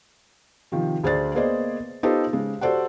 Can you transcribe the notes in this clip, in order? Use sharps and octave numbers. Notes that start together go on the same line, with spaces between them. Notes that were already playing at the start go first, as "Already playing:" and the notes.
C3 D#3 F3
D2 G#4 C5 D5 A6
A#3 B3 G#4 C5 D5 D#5
B3 D#4 F4 G4 A4 C5
C#3 G#3
F#4 G4 A4 C5 D5 F#5